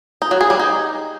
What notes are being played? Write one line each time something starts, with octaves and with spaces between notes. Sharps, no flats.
D#4
F#3
G#4
G3
D#4